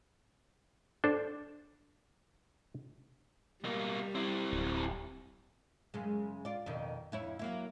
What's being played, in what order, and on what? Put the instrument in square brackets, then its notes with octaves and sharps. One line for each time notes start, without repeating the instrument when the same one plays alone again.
[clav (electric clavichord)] D4 A4 C5
[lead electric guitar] B2 A#3 [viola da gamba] G3
[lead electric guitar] C4 E4
[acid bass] D1
[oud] F#2 C#3 G#3
F4 D5
F2 B2 D#3
F2 E4 C#5
F#3 A#3 E4